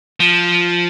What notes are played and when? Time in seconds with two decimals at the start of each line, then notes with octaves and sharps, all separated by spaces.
0.20 F3